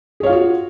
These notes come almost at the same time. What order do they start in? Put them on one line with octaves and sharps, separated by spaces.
G#4 C#5 F5 F4 F#4